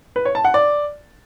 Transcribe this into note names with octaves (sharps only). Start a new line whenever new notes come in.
B4
C#5
A5
F#5
D5